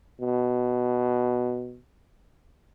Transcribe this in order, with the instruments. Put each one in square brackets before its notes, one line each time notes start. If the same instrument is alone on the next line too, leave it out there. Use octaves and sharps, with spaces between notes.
[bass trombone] B2